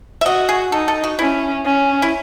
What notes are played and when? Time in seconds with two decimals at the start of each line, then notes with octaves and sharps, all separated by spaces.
0.21 E5
0.25 F#4 D#5
0.49 G#4
0.72 D#4 A4
0.88 A4
1.04 F#4
1.19 C#4 E4
1.65 C#4
2.02 E4